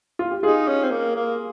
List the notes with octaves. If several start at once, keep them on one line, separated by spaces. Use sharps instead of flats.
F4
G4
D#4 F4 G#4
C#4
C4
A#3
A#3